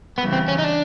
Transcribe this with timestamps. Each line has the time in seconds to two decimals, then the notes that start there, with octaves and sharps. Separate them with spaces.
0.18 C#3 E3 G3 B3
0.33 C4
0.48 C#4
0.59 D#4
0.64 D4